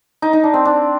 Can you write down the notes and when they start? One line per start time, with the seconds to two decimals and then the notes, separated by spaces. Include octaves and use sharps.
0.22 D#4
0.33 D#4
0.44 D4
0.54 C4
0.65 D4